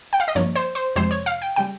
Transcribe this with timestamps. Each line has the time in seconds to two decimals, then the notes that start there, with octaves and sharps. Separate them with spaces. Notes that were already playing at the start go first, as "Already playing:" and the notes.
0.13 G5
0.20 F5
0.28 D#5
0.35 G2 F3 A#3 C#5
0.56 C5
0.75 C5
0.96 F2 C3 F3 G#3 C5
1.11 C#5
1.26 F5
1.42 G5
1.56 C#3 G3 G5